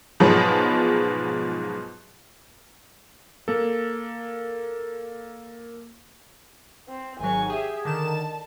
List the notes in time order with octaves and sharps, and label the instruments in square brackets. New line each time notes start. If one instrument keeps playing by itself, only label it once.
[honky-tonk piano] G#2 B2 F3 F#3 G#3 B3
[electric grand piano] A#3 A4
[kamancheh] C4
[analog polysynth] G#1 F#3 [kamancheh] G#5 C#6
[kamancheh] G4 E5 [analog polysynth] G#4
[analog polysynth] D3 D#3 E7 [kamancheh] A5